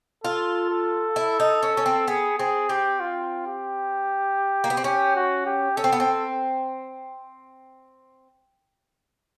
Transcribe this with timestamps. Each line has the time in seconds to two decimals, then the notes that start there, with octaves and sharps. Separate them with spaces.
0.24 F4 A4
0.70 A4
1.16 E4
1.40 D#4
1.63 C#4
1.77 C#4
1.86 C4
2.08 B3 G#4
2.39 C4 G#4
2.69 C4 G4
3.00 F4
3.46 G4
4.64 A#3
4.70 B3
4.77 C4
4.84 C#4 G4
5.15 F#4
5.46 G4
5.77 C#4 A4
5.84 C4
5.92 B3
6.00 C4